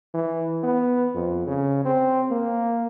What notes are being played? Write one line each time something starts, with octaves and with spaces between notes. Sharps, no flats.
E3
B3
F2
C#3
C4
A#3